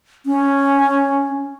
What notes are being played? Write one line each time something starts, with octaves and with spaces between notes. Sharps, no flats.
C#4